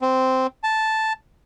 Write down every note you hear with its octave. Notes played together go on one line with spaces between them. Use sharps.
C4
A5